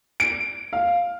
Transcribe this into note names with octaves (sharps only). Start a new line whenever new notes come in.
D7
F5